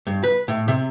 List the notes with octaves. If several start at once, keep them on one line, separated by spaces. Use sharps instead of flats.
G2
B4
A2
C3